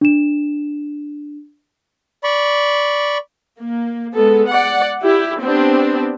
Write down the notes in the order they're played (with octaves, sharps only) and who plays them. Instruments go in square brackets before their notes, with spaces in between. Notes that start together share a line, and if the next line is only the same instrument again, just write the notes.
[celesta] D4 E7
[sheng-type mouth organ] D5 B5 C#6
[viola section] A#3
G#3 B3 A4
D5 F#5
E4 G4
B3 C4 D4 G4